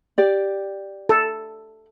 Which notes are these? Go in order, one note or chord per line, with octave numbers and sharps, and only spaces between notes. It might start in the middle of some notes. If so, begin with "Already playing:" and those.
G4 D5
A4